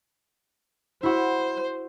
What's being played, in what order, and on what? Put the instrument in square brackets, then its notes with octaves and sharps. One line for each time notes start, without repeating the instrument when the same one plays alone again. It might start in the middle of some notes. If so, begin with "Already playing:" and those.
[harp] E4 F#4 [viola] C5